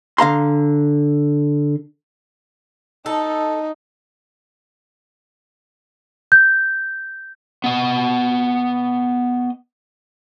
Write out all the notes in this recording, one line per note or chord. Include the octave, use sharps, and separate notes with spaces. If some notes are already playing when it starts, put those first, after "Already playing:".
D3 F5 A#5 C6
D#4 A4
G6
B3 D#5